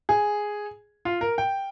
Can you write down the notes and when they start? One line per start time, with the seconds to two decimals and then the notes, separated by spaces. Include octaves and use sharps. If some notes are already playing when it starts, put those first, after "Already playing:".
0.09 G#4
1.05 F4
1.21 A#4
1.38 G5